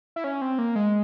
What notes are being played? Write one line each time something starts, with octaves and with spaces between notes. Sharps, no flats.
E4
C#4
C4
A#3
G#3